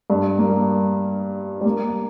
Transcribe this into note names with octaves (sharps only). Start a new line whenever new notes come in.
G2
A#3
G3
G3
A#3